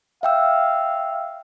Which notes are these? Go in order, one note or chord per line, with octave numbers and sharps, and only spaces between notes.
E5 F5 G5 E6